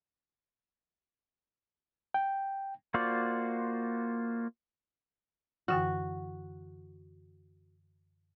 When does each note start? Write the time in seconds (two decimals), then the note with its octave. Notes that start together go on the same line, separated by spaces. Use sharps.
2.14 G5
2.94 A#3 F4 F#4 C5 D5
5.68 F#2 D3 E3 F#4